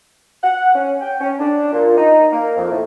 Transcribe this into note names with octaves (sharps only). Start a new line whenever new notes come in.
F#5
C#4
G5
C#4
D4
A#2
D#4
A#3
F2
A2